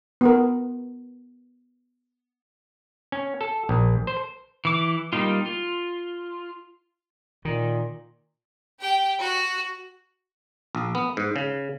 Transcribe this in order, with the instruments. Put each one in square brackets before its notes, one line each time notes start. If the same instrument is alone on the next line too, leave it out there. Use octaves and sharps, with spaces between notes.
[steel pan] B3 A#4
[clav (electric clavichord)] C#4
A4
A#1
C5
[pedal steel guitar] E3 D6
G3 A#3 D#4 F4
F4
[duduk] A#2 [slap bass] D#3
[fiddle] G4 G5
F#4
[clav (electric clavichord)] A#1
B3
G#2
C#3